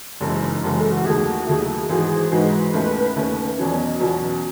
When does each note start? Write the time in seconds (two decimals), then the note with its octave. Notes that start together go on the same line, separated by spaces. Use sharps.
0.20 F#1 F#2 E3 G#3 E4
0.41 D#4
0.63 F#1 F#2 E3 G#3 F#4
0.77 A4
0.91 F#4
1.05 D#2 D#3 F#3 A3 G#4
1.26 F#4
1.47 D#2 D#3 F#3 A3 G#4
1.61 E4
1.75 G#4
1.89 G#2 E3 G#3 D#4 F#4 G#4
2.32 G#2 E3 G#3 D#4 F#4 B4
2.74 D#2 D#3 A3 C#4
3.16 D#2 D#3 A3 C#4
3.57 E2 B2 F#3 C#4 C#5
3.72 D#5
3.86 D#5
4.00 E2 B2 F#3 C#4 F#4